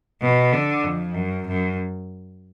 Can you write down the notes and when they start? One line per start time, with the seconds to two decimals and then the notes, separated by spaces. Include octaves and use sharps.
0.21 B2
0.53 D3
0.84 F2
1.15 F#2
1.47 F#2